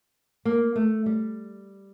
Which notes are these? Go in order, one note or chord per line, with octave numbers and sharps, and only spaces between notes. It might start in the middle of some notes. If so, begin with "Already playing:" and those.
A#3
A3
G3